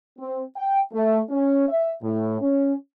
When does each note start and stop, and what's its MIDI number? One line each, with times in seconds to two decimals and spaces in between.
0.19 0.42 60
0.56 0.79 79
0.93 1.19 57
1.29 1.65 61
1.68 1.91 76
2.02 2.38 45
2.41 2.73 61